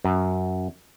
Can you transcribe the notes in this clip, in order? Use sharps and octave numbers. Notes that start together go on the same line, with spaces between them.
F#2